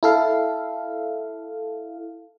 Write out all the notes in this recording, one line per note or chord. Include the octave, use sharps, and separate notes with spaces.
E4 A4 F5